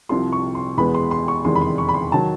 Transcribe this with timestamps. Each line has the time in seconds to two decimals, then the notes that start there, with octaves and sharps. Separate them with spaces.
0.09 C2 C3 F3 C6
0.32 C#6
0.55 C6
0.77 E2 B2 G#3 B3 B5
0.95 C6
1.11 C6
1.28 C#6
1.44 F1 E2 C3 D#3 G#3 C6
1.56 B5
1.62 C6
1.78 C#6
1.89 B5
1.94 C6
2.12 D#3 F#3 A5